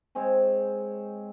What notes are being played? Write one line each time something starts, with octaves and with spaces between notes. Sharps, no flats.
G#3 C4 C#5 G#5